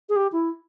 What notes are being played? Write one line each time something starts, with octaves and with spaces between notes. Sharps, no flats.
G#4
G4
E4